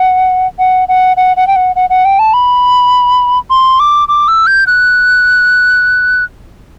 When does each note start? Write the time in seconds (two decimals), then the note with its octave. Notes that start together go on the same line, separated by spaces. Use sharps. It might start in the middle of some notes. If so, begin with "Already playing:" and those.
Already playing: F#5
0.59 F#5
0.88 F#5
1.17 F#5
1.37 F#5
1.47 G5
1.56 F#5
1.76 F#5
1.90 F#5
2.05 G5
2.19 A5
2.33 B5
3.50 C6
3.80 D6
4.08 D6
4.28 E6
4.47 G6
4.67 F#6